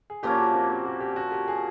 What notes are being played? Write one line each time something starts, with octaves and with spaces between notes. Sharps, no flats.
G#4
A#2 F3 A#3 C#4 G4
F#4
C4
C4
F#4
G4
F#4
G4
G#4